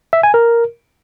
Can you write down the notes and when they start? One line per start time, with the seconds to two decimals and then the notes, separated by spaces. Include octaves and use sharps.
0.13 E5
0.23 G#5
0.34 A#4